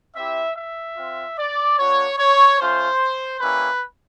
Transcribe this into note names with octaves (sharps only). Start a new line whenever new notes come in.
C4 E4 G4 E5
E5
C4 F4
D5
A#3 D4 F#4 C#5
C#5
A3 C#4 F4 C5
G3 A#3 C#4 E4 B4